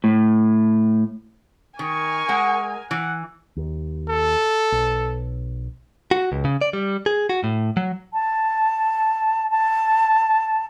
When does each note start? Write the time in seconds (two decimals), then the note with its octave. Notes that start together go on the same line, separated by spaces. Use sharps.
0.04 A2
1.79 D#3 A#4 G#5 C#6
2.29 G#3 F#5
2.91 E3 F#5
3.57 D#2
4.08 A4
4.72 B1
6.11 F#4
6.32 C#2
6.45 C#3
6.61 D5
6.73 G3
7.06 G#4
7.30 F#4
7.44 A2
7.77 F#3
8.13 A5
9.50 A5